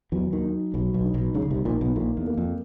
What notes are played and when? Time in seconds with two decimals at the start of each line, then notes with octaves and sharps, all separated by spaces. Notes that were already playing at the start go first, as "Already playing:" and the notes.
0.12 E2 E3 F#3
0.32 D#2 D#3
0.43 D#4
0.74 B1 B2 F#3
0.94 B1 B2
1.05 D#4
1.14 B1 B2
1.34 C#2 C#3 D#4
1.50 C2 C3
1.65 A#1 A#2 D#4
1.81 B1 B2
1.96 A#1 A#2 A#3
2.17 E2
2.27 A#3
2.38 F2